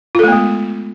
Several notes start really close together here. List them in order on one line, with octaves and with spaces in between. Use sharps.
F4 A4 A3 B3 G#3